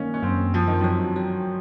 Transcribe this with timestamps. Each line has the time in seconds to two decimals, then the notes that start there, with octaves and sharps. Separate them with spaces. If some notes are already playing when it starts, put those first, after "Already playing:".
Already playing: D#3 A#3 C#4 D#4
0.14 C#4
0.22 F#2 C4
0.54 F3 C4
0.67 D#3
0.81 F3 F#3
1.16 F#3